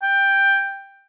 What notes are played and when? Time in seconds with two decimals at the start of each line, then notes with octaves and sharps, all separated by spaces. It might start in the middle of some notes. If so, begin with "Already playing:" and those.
0.03 G5